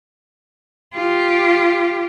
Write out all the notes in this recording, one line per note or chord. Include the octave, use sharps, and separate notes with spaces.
F4 G4